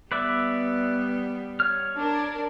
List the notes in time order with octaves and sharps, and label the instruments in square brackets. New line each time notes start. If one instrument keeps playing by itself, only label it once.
[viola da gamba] G3 B3 [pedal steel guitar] B4 D5 E5
[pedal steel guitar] C#5 F6
[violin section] D4 A#4